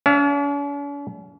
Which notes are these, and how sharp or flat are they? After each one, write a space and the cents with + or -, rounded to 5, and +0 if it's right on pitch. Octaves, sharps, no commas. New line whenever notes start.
C#4 +45 F5 -45